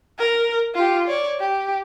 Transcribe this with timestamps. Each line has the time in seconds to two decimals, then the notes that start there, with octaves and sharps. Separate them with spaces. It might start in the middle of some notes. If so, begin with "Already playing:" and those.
0.19 A#4
0.75 F4 G4
1.07 C#5 D5
1.40 G4